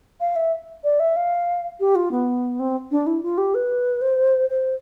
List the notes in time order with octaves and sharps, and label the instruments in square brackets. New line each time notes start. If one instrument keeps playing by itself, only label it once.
[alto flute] F5
E5
D5
E5
F5
G4
F4
B3
C4
D4
E4
F4
G4
B4
C5
C5